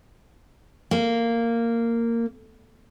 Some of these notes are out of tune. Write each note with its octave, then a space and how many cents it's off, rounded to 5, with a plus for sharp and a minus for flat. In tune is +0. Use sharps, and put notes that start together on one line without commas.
A#3 -10